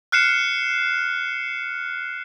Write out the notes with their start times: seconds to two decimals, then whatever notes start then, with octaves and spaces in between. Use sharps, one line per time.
0.12 F6 F#6 C7 C#7 E7